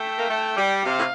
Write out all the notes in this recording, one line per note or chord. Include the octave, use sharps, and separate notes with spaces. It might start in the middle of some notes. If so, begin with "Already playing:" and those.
Already playing: A3 G5
A#3
A3
G3
C3 F5
A2